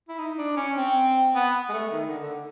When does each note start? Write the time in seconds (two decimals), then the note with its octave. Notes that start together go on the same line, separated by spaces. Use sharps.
0.09 E4
0.19 D#4
0.38 D4
0.57 C#4
0.77 C4
1.35 B3
1.69 G#3
1.73 A3
1.92 D#3
2.07 D3
2.23 D3